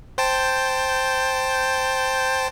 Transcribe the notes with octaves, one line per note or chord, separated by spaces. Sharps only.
C5 G5 A5